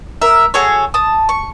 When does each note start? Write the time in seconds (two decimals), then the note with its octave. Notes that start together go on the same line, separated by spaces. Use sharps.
0.22 A#4 E5
0.54 F#4 G#4 A4 C#5
0.94 A5 D#6
1.29 C#6